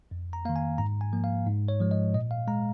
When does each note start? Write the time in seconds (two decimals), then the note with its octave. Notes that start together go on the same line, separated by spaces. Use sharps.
0.11 F2
0.33 A#5
0.45 D#3 A#3 F5
0.56 G#5
0.78 G#2 A#5
1.01 G#5
1.13 F3 A#3
1.24 F5
1.46 G#2
1.68 C#5
1.80 F3 G#3
1.91 D#5
2.14 A#2 D#5
2.31 F5
2.48 G#3 A#5